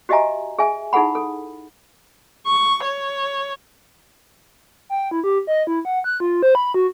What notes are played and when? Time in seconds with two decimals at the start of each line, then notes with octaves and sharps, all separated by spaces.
0.09 F#4 G4 D#5 E5 G#5 A#5
0.59 G#4 E5 G#5
0.93 D#4 E4 G#4 A4 F#5 B5
1.15 A4
2.47 C#6
2.84 C#5
4.90 G5
5.11 E4
5.24 G4
5.47 D#5
5.67 E4
5.85 F#5
6.04 F#6
6.20 F4
6.43 C5
6.55 B5
6.74 F#4